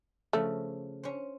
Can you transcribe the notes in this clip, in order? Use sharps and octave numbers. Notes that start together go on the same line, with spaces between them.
C#3 F3 A3
C#4 C5